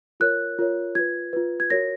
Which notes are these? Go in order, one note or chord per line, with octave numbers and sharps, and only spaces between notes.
F4 A#4 C#5 F#6
F4 A#4 C#5
F4 B4 G#6
F4 B4
G#6
F#4 A#4 C#5 A#6